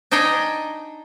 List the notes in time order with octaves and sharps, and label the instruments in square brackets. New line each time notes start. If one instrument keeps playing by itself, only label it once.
[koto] D4 D#4 D#5 G5 G#5 A#5